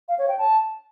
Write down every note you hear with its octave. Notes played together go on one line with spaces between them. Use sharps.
F5
C#5
G5
A5